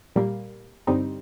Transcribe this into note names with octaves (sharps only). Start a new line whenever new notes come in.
A#2 G3 A#3
G2 D3 G3 C4 D#4